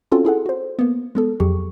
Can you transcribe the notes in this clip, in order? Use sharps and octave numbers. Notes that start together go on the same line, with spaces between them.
C4 C#4 F4 F#4 A4
E4 G#4 A4 F#5
F#4 C5
A#3 B3
G#3 B3 A4
F2 F#3 G4 G#4 C#6